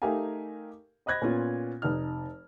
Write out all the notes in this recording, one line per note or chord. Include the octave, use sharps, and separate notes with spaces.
A3 D#4 G4 A#4 F5 G#5
C5 D#5 B5 F#6 G#6 A#6
A#2 B3 C#4 F4
F1 D#4 F6